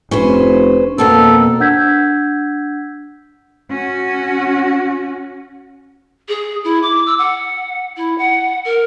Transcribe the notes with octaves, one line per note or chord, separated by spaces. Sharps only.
F1 C#4 B4 C5
F2 B2 A#3 A4 A#4
D4 F#5 E6 G6 G#6 B6
C#4 F#4
G#4
E4
D6
E6
F#5
E4
F#5
A#4